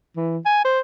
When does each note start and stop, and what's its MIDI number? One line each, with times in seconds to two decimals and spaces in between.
0.16 0.38 52
0.46 0.64 80
0.65 0.80 72